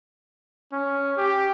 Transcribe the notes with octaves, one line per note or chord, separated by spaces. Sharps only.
C#4
G4